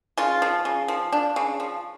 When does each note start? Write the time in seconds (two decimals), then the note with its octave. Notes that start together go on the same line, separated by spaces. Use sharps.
0.18 C#3 F4
0.42 F3
0.65 C#3
0.88 F3
1.13 D4
1.36 C#3
1.60 F3